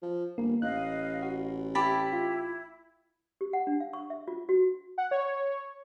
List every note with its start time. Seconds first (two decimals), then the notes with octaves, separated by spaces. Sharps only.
0.02 F3
0.38 G1 A#3
0.62 A1 D#5 F5 F#6
1.22 F#4
1.75 E4 G4 A5 B5
2.13 F4
3.41 G4
3.53 F#5
3.67 D4
3.80 F5
3.93 C#6
4.10 E5
4.28 F4
4.49 F#4
4.98 F#5
5.11 C#5